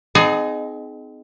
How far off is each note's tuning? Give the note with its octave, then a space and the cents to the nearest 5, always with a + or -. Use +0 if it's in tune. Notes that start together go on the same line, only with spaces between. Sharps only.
C4 -40 D#4 -15 G#4 +20